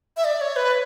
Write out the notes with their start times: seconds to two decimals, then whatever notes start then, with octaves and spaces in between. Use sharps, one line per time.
0.17 E5
0.25 D5
0.41 C#5
0.56 B4